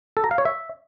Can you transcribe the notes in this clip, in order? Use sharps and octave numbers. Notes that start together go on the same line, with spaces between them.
A4
A#5
F5
C#5
E5